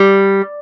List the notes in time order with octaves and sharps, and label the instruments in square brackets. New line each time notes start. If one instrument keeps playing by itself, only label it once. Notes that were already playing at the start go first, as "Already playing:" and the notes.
Already playing: [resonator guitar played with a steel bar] G3